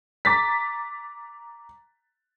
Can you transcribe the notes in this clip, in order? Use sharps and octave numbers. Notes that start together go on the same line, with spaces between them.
A#5 D6 A6 B6